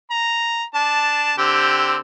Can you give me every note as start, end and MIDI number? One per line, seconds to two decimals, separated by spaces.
0.11 0.63 82
0.74 1.33 62
0.74 1.33 81
1.38 1.97 50
1.38 1.97 60
1.38 1.97 67